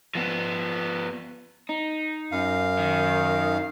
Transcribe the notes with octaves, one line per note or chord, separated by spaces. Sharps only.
F3 B3
D#4
F#2 F5
D#3